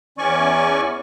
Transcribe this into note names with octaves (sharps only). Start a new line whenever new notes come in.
E2 E3 C#4 D5 G#5 C#6